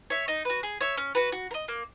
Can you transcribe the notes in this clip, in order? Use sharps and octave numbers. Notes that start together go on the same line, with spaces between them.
C#5 E5
D#4
F#4 B4
G#4
C#5 E5
C#4
F#4 B4
F#4
A#4
D#5
A#3